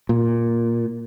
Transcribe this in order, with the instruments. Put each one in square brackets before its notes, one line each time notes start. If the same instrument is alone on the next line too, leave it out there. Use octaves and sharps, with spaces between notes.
[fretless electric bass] A#2